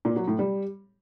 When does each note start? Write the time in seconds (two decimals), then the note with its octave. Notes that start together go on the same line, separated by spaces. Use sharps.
0.05 A#2
0.16 F#3
0.28 A2
0.39 G3